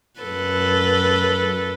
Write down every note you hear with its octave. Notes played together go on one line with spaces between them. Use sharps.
F#2 A4 B4